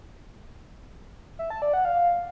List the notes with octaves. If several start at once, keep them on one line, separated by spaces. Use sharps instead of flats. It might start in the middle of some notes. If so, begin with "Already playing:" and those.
E5
A5
D5
F#5
F5